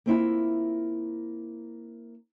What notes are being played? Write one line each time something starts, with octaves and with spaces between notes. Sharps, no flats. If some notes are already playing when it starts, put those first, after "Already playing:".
A#3 C4 E4 F4